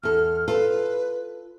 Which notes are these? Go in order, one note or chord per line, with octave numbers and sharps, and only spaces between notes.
E2 A4 F6
F4 A4 B4